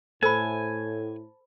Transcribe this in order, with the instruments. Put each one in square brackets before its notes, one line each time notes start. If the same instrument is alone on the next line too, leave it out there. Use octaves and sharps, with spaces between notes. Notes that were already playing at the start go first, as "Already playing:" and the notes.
[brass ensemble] A2 [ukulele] A4 [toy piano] C5 B5 [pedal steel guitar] G#5